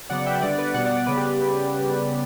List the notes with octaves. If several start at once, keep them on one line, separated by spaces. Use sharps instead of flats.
C#3 F#3 B3 D5 F#5
E5 G5
D3 G3 B3 D5 F#5
B4 D5
B2 G3 B3 D5 F#5
D5 F#5
D5 F#5
C#3 G3 B3 B4 D5
G4